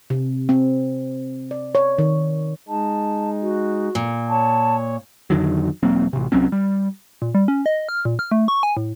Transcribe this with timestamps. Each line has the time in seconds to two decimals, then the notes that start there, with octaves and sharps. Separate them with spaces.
0.10 C3
0.49 C4
1.51 D5
1.75 C#5
1.98 D#3
2.69 G#3 D#4 A5
3.42 F#4
3.95 A#2
4.29 C#5 A5
5.30 F2 D3 D#3 F#3
5.83 E1 F#3 A#3 C4
6.13 A1 C3
6.32 C2 F#3 C4 C#4
6.52 G3
7.22 A#2
7.34 G3
7.48 C#4
7.66 D#5
7.89 F6
8.05 A#2
8.19 F6
8.31 A3
8.48 C#6
8.63 G#5
8.77 A2